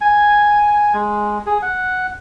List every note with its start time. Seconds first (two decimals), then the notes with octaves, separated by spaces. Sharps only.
0.01 G#5
0.94 G#3
1.46 G#4
1.62 F#5